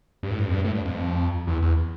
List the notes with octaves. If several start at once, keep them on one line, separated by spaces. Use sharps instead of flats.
G2
A2
G2
F2
G2
A2
G2
F2
E2
E2